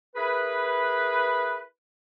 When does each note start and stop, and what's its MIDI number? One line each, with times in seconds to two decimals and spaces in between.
0.16 1.60 64
0.16 1.60 68
0.16 1.60 70
0.16 1.60 71